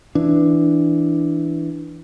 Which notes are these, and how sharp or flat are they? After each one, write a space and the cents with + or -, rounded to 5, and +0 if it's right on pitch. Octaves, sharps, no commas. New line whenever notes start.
E3 +0 D4 +0